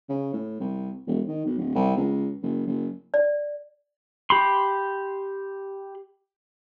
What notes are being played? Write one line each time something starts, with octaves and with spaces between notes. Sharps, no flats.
C#3
A2
C2
E1
D#3
B1
D1
C2
C#2
F#1
F#1
D5
G4 B5 C6